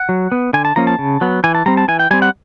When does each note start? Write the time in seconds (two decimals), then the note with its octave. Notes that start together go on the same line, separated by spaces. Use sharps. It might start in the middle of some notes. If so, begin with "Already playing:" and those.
Already playing: F#5
0.09 F#3
0.32 B3
0.53 D3 G#5
0.65 A5
0.76 F3 A#3 C#4 A#5
0.87 A5
0.99 C#3
1.21 F#3 B3
1.44 E3 G#5
1.55 A5
1.66 G3 C4 A#5
1.77 A5
1.88 E3 G#5
1.99 G5
2.11 G3 C4 G#5
2.22 F#5